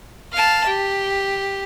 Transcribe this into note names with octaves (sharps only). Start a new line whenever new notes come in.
F5 A5
G4